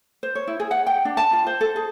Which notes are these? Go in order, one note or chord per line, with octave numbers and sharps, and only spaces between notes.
C5
C#5
E4
G#4
F#5
G5
D4
A5
F4
C5
A4
G#4